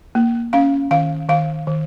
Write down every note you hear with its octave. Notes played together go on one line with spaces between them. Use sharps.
A#3
C#4 F5
D#3 F5
D#3 F5
D#3